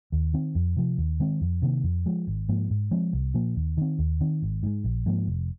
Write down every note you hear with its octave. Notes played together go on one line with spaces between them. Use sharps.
D#2
D#3 C4
F2
C3 F3
D#2
D#3 G#3 C4
F2
C3 D#3 A#3
F2
F3 G#3
G#1
G#2 F3 A#3
G#2
F3 G#3 C4
C2
A#2 F3 A#3
D#2
D#3 C4
D#2
D#3 C4
G#1
G#2 G#3
A#1
G#2 F3 A#3
F1